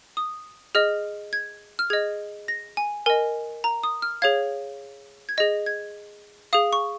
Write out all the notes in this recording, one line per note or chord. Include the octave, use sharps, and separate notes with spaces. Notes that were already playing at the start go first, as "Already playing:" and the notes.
D#6
G#4 D#5 F6
G#6
F6
G#4 D#5 G#6
A#6
G#5
A#4 D#5 G#5
A#5
D#6
F6
G#4 C#5 F5 G#6
G#6
G#4 D#5 A#6
G#6
G#4 F5 D#6
C#6